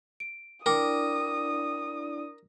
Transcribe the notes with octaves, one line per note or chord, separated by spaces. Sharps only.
D7
D4 E4 A#4 D5 G5 D6 D#6